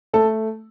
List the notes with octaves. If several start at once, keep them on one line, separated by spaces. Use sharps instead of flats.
A3 A4